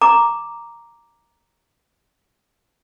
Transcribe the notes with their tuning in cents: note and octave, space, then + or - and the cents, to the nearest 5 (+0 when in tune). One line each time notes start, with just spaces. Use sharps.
A#5 +0 D6 +0